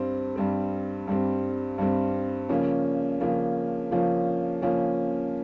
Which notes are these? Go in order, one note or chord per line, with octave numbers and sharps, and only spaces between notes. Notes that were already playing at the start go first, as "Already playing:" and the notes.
Already playing: G2 G3 C4
G2 G3 C4
G2 G3 C4
G2 G3 C4
C#3 F3 A#3 C#4
C#3 F3 A#3 C#4
C#3 F3 A#3 C#4
C#3 F3 A#3 C#4